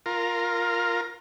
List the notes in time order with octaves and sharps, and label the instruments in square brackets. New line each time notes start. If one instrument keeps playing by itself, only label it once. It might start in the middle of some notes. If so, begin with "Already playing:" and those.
[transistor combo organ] F4 A#4